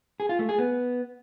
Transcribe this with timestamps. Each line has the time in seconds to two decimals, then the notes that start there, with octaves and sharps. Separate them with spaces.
0.20 G#4
0.29 F4
0.39 A3
0.49 G#4
0.58 B3